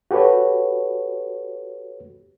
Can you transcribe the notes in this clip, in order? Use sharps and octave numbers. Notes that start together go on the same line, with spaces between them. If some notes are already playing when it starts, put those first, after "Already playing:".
F#4 G4 A4 B4 C#5